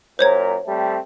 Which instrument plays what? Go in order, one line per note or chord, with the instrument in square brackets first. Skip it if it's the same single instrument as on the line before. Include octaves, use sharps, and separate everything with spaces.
[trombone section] F#2 A#2 A#4 [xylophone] C5 C#5 G#6
[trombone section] G3 A3 C4